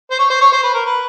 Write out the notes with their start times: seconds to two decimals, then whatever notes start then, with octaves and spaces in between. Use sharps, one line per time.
0.11 C5
0.19 C#5
0.30 C5
0.41 C#5
0.52 C5
0.63 B4
0.74 A#4
0.86 B4